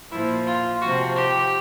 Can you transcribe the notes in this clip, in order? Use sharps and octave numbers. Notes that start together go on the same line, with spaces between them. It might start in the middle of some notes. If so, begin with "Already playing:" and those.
A#2 F3 E4
F4
C3 F3 F#4
G4